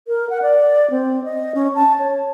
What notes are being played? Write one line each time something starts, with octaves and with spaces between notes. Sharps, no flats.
A#4
F#5
D5
C4
D#5
C#4
A5
C#5